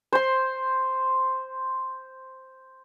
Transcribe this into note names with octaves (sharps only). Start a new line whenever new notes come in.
C5 C6